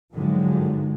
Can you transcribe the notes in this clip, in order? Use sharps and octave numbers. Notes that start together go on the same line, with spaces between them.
G#2 D3 D#3 F3 F#3 G#3